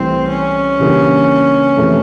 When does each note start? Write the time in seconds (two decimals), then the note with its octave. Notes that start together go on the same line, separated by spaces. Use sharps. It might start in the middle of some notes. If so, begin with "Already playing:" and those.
Already playing: C2 C3 E3 A3 C4
0.29 C#4
0.79 C#3 E3 G3 A#3 D4
1.77 F2 C3 E3 A3